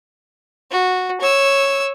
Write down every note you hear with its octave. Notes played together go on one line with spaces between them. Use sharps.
F#4
C#5 E6